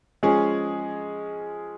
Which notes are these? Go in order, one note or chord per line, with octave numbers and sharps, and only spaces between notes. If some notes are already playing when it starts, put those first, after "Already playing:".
F3 G#3 C#4 G#4